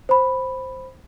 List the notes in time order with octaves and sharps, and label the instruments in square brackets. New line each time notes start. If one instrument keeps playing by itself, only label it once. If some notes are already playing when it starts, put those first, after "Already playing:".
[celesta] C5 B5